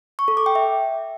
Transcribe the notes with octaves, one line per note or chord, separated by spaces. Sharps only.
C#6
A4
D6
G5
E5